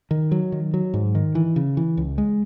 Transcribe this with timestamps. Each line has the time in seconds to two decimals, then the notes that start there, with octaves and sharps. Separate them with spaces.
0.11 D#3
0.31 F#3
0.52 D#3
0.74 F#3
0.94 G#2
1.15 D#3
1.35 E3
1.56 C#3
1.77 E3
1.97 C#2
2.18 G#3